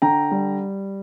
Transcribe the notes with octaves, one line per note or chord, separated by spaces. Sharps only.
D3 G5 A#5
G3